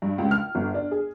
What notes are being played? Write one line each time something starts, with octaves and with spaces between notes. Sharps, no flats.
G2
C#2
F6
G1
D4
G#4